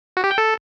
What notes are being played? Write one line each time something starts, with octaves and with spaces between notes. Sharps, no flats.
F#4
G4
G5
A4